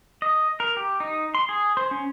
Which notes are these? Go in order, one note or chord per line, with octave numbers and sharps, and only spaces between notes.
D#5
A#4
G4
D#4
C6
G#4
C5
C#4